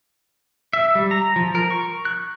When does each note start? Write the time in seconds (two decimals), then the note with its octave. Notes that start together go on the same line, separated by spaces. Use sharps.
0.73 E5
0.95 G3
1.11 A#5
1.36 F3
1.55 A#4
1.70 C#6
2.05 F#6